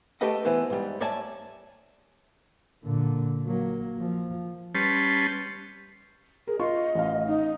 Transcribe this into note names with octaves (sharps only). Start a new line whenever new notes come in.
A3 G4 A4 B4 D#5 F#5
E3 B3 C5
G#2 G3
C#5 D5 E5 G#5 A5
A#2 D3
F#3 A#3
F3
G3 C#4 B4 A5 C6
G#4 A#4
F4 D#5 C6 C#6
A1 F5
D#4